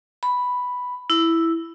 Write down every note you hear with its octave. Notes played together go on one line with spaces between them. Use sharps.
B5
E4